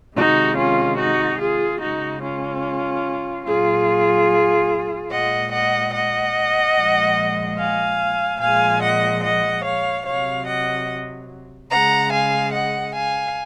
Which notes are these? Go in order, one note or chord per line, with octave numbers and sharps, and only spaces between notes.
C3 D#3 G#3 D#4 F#4
C#4 F4
D#4 F#4
F4 G#4
C#3 G#3 D#4 F#4
C#4 F4
A#2 F#3 F4 G#4
A#2 G#3 D#5 F#5
D#5 F#5
D#5 F#5
A#2 F3 G#3
F5 G#5
A#2 F3 G#3 F5 G#5
D#5 F#5
D#5 F#5
C#5 F5
C3 F#3 C#5 F5
D#5 F#5
C#3 G#3 F#5 A#5
F5 G#5
D#5 F#5
F5 G#5